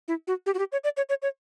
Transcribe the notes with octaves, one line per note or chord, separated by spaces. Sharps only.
E4
F#4
G4
F#4
G4
C#5
D5
C#5
C#5
C#5